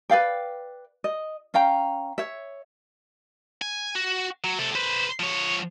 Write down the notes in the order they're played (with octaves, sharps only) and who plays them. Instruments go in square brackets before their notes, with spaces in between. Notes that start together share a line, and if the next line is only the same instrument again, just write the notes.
[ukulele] B4 D5 F5 G5
D#5
C#4 F5 G5 A#5
C#5 E5
[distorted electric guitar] G#5
F#4
F#3
C3 A4
B4 C5
F3 C#5